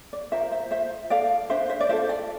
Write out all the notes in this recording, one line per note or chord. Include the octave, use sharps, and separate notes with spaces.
D5
F4 A#4 C5 E5
C5 E5
F4 C5 E5
A4 D5 F5
D4 C5 E5
C5 E5
D5
F4 A4 C5 E5
D5